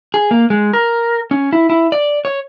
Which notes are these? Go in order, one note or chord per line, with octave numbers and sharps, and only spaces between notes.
G#4
A#3
G#3
A#4
C#4
E4
E4
D5
C#5